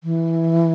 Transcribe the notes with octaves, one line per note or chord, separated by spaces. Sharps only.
E3